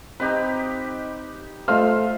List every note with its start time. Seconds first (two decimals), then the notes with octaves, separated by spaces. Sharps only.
0.20 C4 D#4 G4 B4 D#5
1.68 A3 F4 C5 D#5 E5 F6